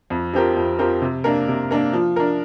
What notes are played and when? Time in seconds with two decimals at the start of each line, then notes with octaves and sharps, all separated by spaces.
0.10 F2
0.33 F3 C4 G4 A#4
0.56 F2
0.79 F3 C4 G4 A#4
1.02 C3
1.24 A#3 D4 A#4
1.48 C3
1.71 A#3 D4 A#4
1.93 F3
2.16 D4 A#4